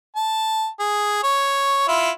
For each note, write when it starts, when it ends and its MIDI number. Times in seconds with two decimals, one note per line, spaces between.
0.16 0.68 81
0.80 1.23 68
1.24 1.86 73
1.88 2.10 64
1.88 2.10 65